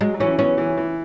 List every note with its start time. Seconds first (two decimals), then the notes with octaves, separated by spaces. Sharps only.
0.01 F#3 G#3
0.14 F#3
0.20 E3 C#4
0.39 B3 C#4
0.58 E3
0.77 E3